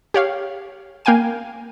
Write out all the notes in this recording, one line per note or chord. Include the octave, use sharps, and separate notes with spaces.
G4 C#5 F5
A#3 F5 G5 G#5 D#7